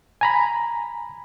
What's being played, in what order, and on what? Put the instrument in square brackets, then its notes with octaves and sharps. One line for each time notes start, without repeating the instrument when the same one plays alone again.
[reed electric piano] G#5 A#5 B5